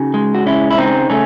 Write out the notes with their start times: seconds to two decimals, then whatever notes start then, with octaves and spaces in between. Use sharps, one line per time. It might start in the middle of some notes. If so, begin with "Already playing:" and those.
Already playing: C#3 D#4 F#4
0.14 G#3
0.35 F#4
0.46 C#3 C#4 E4
0.71 E4
0.78 C#3 C4 D#4
1.10 C#3 A3 C#4